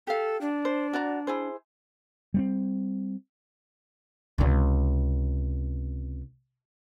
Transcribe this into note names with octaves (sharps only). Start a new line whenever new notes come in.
G4 A4 F5
D4
C5
F#4 D5 A#5
E4 G#4 C5
G3 B3 C4
C#2 C3